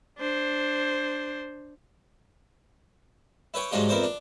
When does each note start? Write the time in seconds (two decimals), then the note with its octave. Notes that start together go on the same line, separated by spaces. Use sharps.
0.18 D4 C5
3.54 E4 B4 C#5 G5
3.71 G#2 F#3 G#3 D4 F4 G4
3.89 F2 B3 E4 A#4 C5 D5
4.03 D4